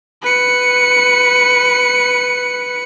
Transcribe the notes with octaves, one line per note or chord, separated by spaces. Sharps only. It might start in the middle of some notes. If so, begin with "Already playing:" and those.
B4 C#7